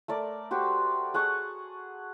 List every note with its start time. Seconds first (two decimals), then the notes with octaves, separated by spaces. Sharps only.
0.08 A3 A#4 D5
0.51 F#4 G4 C5
1.14 G#4 F#5 A5 C#6